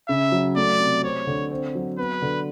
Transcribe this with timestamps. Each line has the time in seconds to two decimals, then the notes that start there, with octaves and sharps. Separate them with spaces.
0.08 C#3 E5
0.32 F#3
0.56 A3 D5
0.80 C3
1.03 C4 C#5
1.27 D3
1.51 C4
1.75 F#3
1.98 B3 B4
2.22 D3